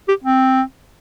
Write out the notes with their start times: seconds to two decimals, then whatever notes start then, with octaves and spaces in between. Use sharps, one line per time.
0.08 G4
0.24 C4